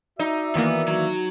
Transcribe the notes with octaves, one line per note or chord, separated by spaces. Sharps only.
D#4 F#4 D5 E5
D#3 E3 A#3 B3
F#3